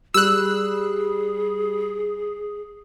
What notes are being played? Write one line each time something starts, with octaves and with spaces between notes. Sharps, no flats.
G3 G#4 E6 F#6